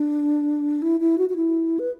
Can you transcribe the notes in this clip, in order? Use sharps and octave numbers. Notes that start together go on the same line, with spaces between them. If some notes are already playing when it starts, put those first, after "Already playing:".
Already playing: D4
E4
E4
F#4
F#4
E4
B4